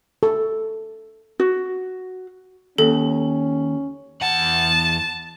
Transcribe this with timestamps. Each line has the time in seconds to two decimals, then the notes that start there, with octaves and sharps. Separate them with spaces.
0.23 A4
1.40 F#4
2.78 D#2 C#4 A4
4.22 E2 F#5 A5